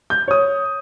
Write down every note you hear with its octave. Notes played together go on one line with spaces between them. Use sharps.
G6
C#5 D#6